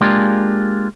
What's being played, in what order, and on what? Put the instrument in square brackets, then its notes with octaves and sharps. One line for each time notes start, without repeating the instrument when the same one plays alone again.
[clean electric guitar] G#3 A#3 D4 F4 G4 G#4